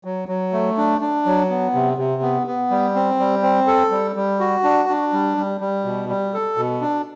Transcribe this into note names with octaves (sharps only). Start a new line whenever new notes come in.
F#3
F#3
A3
D4
D4
F#3
B3
C3
C3
B3
B3
G3
C4
G3
C4
A4
G3
G3
F#4
D4
D4
G3
G3
G3
B2
G3
A4
B2
D4